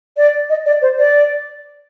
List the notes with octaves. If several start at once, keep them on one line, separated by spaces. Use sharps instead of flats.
D5
D#5
D5
C5
D5